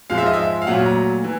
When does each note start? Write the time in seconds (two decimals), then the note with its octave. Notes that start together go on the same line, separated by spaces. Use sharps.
0.10 G#2 F3 G#3 F5
0.18 E5
0.26 D#5
0.33 E5
0.62 F5
0.67 A#2 F#3 A3 F#5
0.86 A#5
1.24 E3